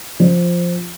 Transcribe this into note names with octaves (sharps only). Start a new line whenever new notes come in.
F3